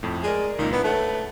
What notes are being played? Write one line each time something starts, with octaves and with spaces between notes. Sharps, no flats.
F2 A2
G#3 A#4 D5 G#5
C#2 A#2 D#3
B3 D4 E4 B4
A3 B4 C#5 F#5